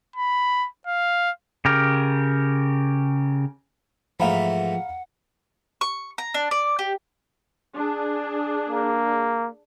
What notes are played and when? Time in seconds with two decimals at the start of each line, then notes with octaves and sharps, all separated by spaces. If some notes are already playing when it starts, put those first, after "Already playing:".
0.16 B5
0.87 F5
1.65 C#3 G4 A#4
4.20 G#2 E3 F3 A3 F5 F#5 A#5 B5
5.81 C#6
6.18 A#5
6.34 D4
6.51 D5
6.79 G4
7.76 D4 G#4
8.69 A#3